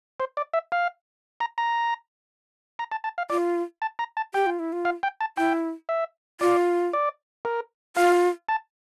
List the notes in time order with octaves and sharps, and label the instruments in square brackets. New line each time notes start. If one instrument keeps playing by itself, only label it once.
[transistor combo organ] C5
D5
E5
F5
A#5
A#5
A#5
A5
A5
F5
[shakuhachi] F4 [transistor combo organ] D5
[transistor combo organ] A5
A#5
A5
[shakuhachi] G4 [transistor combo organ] G5
[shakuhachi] F4
E4
F4
[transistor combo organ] F5
G5
A5
[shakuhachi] E4 [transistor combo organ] G5
[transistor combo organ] E5
[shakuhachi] F4 [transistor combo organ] D5
[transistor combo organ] D5
A#4
[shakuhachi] F4 [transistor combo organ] F5
[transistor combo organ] A5